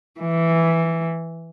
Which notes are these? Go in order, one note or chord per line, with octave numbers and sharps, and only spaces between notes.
E3